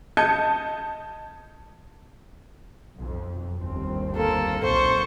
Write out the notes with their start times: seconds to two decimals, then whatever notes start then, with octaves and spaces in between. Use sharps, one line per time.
0.17 D#5 A5 G6 G#6 C#7 D#7
2.95 B1 F2
3.57 G1 D#2 C4
4.16 A#3 A4
4.64 B1 A#2 C5 C#6